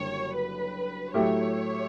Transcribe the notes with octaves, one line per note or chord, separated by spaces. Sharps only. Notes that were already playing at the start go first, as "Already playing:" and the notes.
Already playing: F#1 F#2 D3 G3 C#5
B4
A2 F#3 A3 E4 G4 C#5